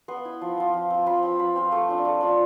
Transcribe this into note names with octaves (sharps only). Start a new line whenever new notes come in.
B3 C6
E4
F3
C4 F4
F3
C4 F4
F3 B5
C4 F4
F3 B5
C4 F4
A3
D4 F4
A3
D4 F4